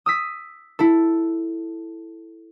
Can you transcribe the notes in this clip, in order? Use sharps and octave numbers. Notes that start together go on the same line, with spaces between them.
D#6 E6 B6
E4 A4